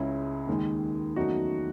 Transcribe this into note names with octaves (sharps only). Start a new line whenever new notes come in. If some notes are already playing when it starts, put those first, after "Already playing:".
Already playing: C#2 C#3 G#3 C#4 E4 G#4
D#2 D#3 G#3
E2 D#3 F#3 A3 C#4 D#4 F#4